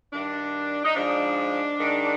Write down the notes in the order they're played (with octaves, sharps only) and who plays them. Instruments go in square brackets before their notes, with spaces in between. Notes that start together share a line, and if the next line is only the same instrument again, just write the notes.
[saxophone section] G2 D#3 D4
D#4
G#2 F3 D4
G#2 D#3